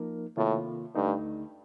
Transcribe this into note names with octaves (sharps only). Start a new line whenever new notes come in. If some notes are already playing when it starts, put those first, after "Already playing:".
Already playing: F3 A#3 D#4 A#4
A2 C3 D#3 A#3 F4
D2 G2 D3 A3 D#4